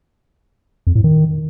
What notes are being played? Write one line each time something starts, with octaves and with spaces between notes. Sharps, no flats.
F2
A2
D#3